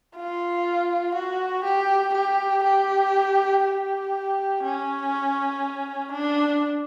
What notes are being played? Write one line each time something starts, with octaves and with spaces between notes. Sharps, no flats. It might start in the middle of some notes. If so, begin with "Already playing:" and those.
F4
F#4
G4
G4
G4
G4
C#4
D4